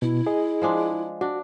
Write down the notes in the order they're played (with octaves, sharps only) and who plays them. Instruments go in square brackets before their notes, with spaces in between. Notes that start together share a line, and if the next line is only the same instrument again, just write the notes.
[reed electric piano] B2 [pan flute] E4
[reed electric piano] G#4 D#5
[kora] F3 G#3 D4
[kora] D4 [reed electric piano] F#4